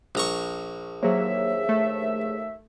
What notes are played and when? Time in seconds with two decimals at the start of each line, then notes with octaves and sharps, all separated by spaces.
0.15 A#1 A#5 C#6
1.03 D#2 F#3 A#3 G#4 C5 C#5 E5
1.69 A3